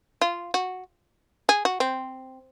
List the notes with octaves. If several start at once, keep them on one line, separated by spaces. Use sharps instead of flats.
F4
F#4
G#4
F#4
C4